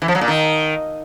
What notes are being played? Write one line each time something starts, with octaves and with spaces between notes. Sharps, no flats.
E3
F3
F#3
A#2
D#3